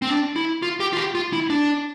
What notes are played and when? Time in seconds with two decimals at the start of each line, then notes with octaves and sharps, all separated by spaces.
0.02 C4
0.09 D4
0.36 E4
0.62 F4
0.80 G4
0.93 F4
0.97 G4
1.15 F4
1.33 E4
1.50 D4